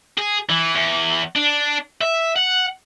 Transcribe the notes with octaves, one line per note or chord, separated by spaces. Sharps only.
G#4
E3
E2
D4
E5
F#5